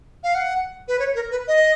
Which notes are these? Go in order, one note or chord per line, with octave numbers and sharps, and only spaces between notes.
F5
F#5
B4
C#5
A#4
B4
D#5